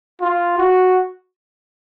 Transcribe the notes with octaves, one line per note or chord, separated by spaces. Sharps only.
F4
F#4